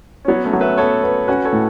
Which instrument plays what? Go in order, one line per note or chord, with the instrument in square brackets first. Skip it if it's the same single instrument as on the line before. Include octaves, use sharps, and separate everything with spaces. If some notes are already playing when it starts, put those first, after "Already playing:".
[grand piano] C#4
[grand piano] F#3 B3 [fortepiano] C#5
[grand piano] A3 C#4
[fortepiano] F#3
[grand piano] B4 E5
[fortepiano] B3 [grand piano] A4 C#5
[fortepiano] B3
[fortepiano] C#4 [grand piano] F#4 B4
[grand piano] A4 C#5
[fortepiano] A2